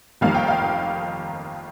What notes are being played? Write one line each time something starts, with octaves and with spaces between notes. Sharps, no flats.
F1 F2 D#3 G3 A#3 F5
G5
F5